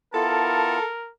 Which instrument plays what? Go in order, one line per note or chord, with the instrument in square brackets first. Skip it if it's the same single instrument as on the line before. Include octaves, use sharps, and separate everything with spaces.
[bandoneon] B3 E4 F4 [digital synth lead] A4 [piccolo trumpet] A#4 [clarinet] A5